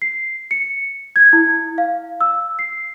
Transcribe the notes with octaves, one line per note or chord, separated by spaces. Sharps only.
C7
C#7
G#6
E4
F5
E6
C7